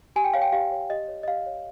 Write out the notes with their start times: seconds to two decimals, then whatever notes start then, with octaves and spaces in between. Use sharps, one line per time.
0.16 G4 G#5
0.24 G5
0.34 C#5 F5
0.42 G5
0.52 G4 F5
0.71 C#5
0.90 G4 D#5
1.08 C#5
1.23 D#5
1.28 G4 F5
1.46 C#5